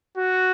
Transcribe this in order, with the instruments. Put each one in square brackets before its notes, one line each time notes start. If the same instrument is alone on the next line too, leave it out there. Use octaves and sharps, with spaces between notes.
[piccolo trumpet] F#4